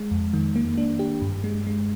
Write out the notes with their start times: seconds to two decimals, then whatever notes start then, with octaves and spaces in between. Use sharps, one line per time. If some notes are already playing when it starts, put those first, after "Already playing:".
Already playing: G#3
0.11 F2
0.34 D#3
0.56 A#3
0.78 D4
0.99 G4
1.22 G2
1.44 G#3
1.67 G#3